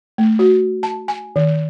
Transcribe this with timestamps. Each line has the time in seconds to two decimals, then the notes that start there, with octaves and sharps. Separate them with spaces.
0.18 A3
0.39 F#4
0.83 A5
1.08 G#5
1.36 D#3